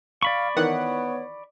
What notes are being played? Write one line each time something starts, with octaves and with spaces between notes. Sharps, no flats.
D5 F5 B5 C#6
D#3 E3 B3 C#5 F#5